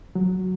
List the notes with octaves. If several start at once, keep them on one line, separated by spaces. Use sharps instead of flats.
F#3